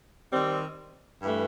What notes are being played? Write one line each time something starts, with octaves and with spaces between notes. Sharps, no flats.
D#3 G3 C4
G2 E3 A3